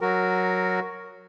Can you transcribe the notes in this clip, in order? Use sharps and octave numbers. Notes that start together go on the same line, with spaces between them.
F#3 F#4 A#4